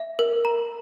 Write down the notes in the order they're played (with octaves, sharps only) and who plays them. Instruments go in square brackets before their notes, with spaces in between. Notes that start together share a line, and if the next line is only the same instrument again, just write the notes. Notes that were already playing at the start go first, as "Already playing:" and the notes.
Already playing: [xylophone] E5
A#4
A#5